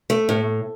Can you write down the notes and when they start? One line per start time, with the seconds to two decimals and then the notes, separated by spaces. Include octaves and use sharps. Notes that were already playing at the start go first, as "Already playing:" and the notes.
0.10 A3
0.29 A2